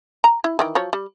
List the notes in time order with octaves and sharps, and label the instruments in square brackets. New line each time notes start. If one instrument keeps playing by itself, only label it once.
[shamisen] A#5
E4
D#3 E3 G5
F3 F#3 C#5
G3